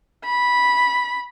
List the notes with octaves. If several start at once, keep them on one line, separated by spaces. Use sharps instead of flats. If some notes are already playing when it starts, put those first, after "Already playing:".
B5